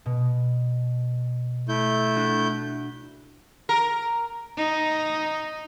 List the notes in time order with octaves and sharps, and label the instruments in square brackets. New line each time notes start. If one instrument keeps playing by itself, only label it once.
[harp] B2
[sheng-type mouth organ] A3 E4 G6
[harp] D4 F#4
[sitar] A#4
[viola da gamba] D#4